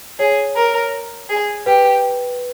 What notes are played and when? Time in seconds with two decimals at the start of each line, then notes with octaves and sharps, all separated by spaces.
0.19 G#4 C#5
0.56 A#4
1.29 G#4
1.66 G4 B4